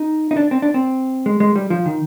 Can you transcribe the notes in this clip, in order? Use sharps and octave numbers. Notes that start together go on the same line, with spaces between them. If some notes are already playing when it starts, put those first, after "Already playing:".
Already playing: D#4
D#4
D4
C4
D4
C4
G#3
G#3
G3
F3
D#3